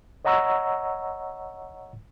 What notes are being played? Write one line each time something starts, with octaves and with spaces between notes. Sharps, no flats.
C#5 D#5 F#5 A#5 C#6 E6